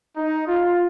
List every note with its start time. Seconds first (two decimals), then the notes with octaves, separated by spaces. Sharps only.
0.17 D#4
0.46 F4